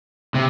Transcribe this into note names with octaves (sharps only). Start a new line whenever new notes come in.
C3